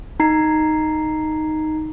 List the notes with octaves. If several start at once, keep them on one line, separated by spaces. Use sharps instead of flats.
D#4 A#5 G#6 C7